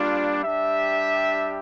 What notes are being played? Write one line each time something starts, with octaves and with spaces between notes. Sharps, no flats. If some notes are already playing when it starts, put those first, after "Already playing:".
Already playing: G3 A#3 D4 F4
G3 D4 G4 E5